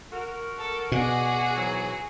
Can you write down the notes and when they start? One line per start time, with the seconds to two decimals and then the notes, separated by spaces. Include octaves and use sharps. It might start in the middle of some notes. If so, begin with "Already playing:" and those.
0.12 F#4 A#4
0.59 A4
0.92 B2 F#4 G#4 D5 F#5
1.56 G#2 E3 F#3